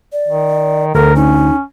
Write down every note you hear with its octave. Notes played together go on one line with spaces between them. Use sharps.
D5
D#3
D2 A4 A#4
C#4 D#4